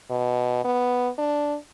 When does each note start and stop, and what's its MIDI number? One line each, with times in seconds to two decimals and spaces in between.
0.10 0.63 47
0.64 1.09 59
1.18 1.56 62